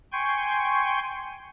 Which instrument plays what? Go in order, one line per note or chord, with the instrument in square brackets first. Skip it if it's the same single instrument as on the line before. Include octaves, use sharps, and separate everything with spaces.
[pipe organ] G5 G#5 C6 C#6